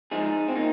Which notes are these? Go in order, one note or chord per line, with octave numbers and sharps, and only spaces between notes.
F3 G#3 D#4 G#4
C4
A#2 A#3 D#4